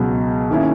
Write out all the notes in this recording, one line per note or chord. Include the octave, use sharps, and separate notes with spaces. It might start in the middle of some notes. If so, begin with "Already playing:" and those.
Already playing: C#2 B2 F#3
D#3 A#3 C#4 E4